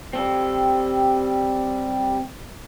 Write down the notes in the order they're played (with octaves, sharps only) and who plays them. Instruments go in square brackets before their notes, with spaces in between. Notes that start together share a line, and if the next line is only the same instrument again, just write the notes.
[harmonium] G3 [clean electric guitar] C4 A4